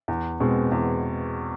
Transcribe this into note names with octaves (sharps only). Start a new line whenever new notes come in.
E2
B2 G#3 C4
E2